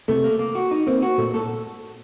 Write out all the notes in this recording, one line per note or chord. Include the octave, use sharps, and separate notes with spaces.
C3 A3
A#3
A#3
F#4
D#4
A#3 C4
F#4
A#2 A3
A3 A4